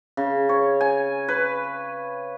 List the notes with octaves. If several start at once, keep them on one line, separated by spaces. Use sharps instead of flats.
C#3
C#5
G#5
B4